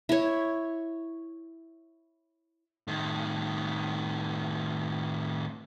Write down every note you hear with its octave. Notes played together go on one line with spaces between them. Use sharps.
E4 C#5
A2 D#3